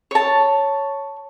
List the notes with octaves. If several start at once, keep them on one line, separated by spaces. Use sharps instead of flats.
C#5 A5